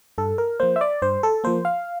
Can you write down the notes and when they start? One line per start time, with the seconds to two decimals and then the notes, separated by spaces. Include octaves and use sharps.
0.18 G2 A4
0.38 A#4
0.60 F3 A#3 C5
0.76 E5
0.81 D5
1.02 G2 C5
1.23 A4
1.44 F3 A#3 C5
1.65 F5